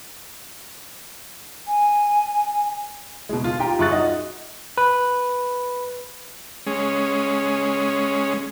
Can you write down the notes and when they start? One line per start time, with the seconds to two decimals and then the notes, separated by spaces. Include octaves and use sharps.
1.68 G#5
3.29 B2 G#3
3.44 F4
3.60 F4 G4 G5 A#5
3.79 F#2 F4 G#4 C#6 F#6 A6
3.91 D#4 F#4 D#5
4.78 B4
6.67 G#3 C#4